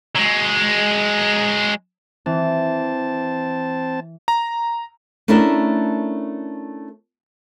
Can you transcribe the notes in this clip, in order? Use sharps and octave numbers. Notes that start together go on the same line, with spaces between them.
F#3 G#3
E3 C4 A5
A#5
A3 C#4 D4 E4 A4 A#4